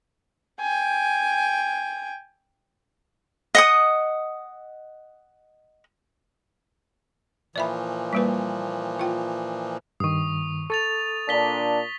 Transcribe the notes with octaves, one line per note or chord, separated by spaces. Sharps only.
G5 G#5
D#5 F#5 D#6
A#2 E3 F3 D5 E5 B5
G3 A#3 B4
F4 G5
G2 D#3 C#6 D#6
A4 C#6 A6 F7
A#2 D4 B6 G7